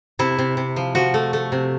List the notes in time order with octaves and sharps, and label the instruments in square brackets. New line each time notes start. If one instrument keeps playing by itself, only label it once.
[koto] C3 E4
C3
C3
F3
F3 F#4
A3
A3
C3